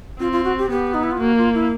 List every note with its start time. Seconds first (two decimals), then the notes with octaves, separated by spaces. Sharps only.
0.20 C4 F4
0.32 F4
0.44 F#4
0.58 G4
0.70 B3 G4
0.94 D#4
1.03 E4
1.12 F4
1.20 A#3 F#4
1.38 F4
1.54 E4